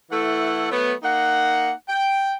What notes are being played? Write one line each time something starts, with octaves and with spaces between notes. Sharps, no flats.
E3 A3 E4 A4 F#5
F#3 A3 B3
A#3 D#4 F#5
G5